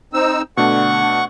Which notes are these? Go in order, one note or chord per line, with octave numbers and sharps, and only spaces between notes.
C4 D#4 E6
B2 D3 A3 D4 F#5 C#6